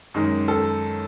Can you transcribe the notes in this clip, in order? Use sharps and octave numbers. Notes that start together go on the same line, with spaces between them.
F#2 D#3 G#3
A4